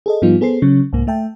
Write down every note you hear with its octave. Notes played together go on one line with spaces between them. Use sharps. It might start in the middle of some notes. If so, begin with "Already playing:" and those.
G#4 A4 D#5
G#2 F3 G3 B3 D#4 F4
B3 G#4 A4 C5 C7
C#3 F#3 C#4
C2 G#2 A#3
A3 E5 G5 A5